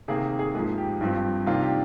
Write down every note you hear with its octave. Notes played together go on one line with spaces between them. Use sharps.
C3 D#3 A#3 G#4
G#4
G#2 F3 A#3 G#4
G4
G2 F3 C4
C3 D#3 A#3 D4 F4
G4